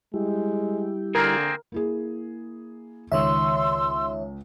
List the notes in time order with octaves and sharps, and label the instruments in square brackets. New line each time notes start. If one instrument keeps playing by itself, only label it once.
[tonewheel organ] G3 E4 G4 [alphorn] G#3
[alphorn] D3 [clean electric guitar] A#3 C4 G#4 [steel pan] A#4
[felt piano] A#3 E4 G#4
[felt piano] C#2 [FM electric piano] D#3 C#5 E5 [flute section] C6 E6